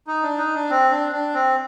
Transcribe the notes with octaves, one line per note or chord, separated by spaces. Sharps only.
D#4
D4
D#4
D4
C4
D4
D4
C4